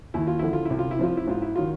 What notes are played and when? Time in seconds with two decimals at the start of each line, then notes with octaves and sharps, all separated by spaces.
0.14 D#2 E4
0.27 F4
0.39 D3 F3 E4
0.53 F4
0.65 E4
0.70 C2
0.79 F4
0.91 E4
0.99 C3 F3 F4
1.17 E4
1.27 G#2 F4
1.42 E4
1.56 D#3 F#3 F4